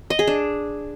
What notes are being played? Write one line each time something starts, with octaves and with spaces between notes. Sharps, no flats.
D#5
G#4
D4